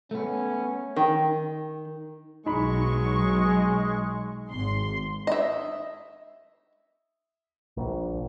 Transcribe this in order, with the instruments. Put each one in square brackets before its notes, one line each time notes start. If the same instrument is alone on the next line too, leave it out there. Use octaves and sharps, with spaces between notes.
[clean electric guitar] A3 B3 [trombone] C#4
[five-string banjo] D#3
[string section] B1 F#3 C#6 [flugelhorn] G#3 [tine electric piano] D#4 B5
[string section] G#1 C6
[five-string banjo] D#5 E5
[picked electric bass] A#1